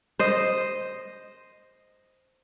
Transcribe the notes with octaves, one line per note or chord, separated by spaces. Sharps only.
C5 D#5